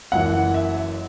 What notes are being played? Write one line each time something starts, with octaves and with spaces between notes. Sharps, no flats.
F#1 F#2 E3 F#5
E5